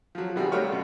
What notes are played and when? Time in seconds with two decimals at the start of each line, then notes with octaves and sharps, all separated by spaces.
0.15 F3 F#3
0.36 B2 D#3 G3 C4 F#4 G#4
0.52 A3 F#4 G4 A#4 C#5 F5
0.69 F#2 B2